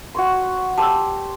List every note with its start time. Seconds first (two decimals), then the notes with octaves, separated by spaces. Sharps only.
0.15 F#4 C#5 C6
0.78 G4 C5 A5 E6